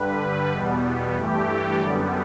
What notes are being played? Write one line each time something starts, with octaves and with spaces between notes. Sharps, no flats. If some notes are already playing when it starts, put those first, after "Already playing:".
Already playing: G2 D3 G3 B4
E2 B2 G3 B3
G2 E3 A3 G4
F#2 D3 G3 B3 D5